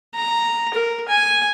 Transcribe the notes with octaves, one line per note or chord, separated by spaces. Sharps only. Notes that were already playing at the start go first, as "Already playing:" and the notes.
A#5
A#4
G#5